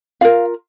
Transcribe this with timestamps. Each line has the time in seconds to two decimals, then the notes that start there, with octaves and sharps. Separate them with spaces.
0.21 F4 A#4 F5